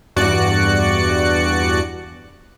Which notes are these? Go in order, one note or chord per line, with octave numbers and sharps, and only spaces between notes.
E2 G2 F#4 D5 F#6 C#7